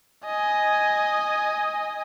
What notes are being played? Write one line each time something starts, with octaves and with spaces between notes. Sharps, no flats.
D#5 G#5